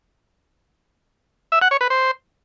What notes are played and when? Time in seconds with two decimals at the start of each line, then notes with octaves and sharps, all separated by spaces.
1.52 E5
1.62 F#5
1.71 C#5
1.81 B4
1.90 C5